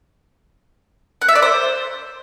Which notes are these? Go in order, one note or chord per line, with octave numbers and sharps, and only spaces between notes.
F#5
E5
D5
C5